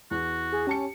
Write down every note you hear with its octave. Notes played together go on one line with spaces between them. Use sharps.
E2 F#4
G#4
C#4 G4 A5 C#7